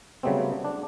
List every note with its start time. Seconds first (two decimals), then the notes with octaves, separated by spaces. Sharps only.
0.23 C#3 F#3 G3 A3 B3 C4
0.65 D4